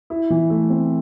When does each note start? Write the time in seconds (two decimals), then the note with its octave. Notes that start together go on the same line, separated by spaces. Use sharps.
0.10 E4
0.30 E3
0.50 A3
0.70 C4